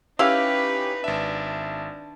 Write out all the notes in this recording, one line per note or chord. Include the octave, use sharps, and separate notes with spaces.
C#4 D#4 E4 G4 B4 F5
G#1 D4 E5